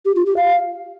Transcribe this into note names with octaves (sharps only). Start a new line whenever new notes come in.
G4
F4
G4
F5